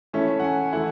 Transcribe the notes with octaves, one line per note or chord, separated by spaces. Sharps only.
E3 A3 C#4 E5
F#5
G#5
E3 A3 E4 F#5